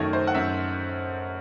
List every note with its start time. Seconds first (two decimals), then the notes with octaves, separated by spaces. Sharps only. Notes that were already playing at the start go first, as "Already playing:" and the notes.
Already playing: F#2 D#3 F#3 A3 C#5 D#5
0.13 C5
0.27 F#5
0.34 F#2 E5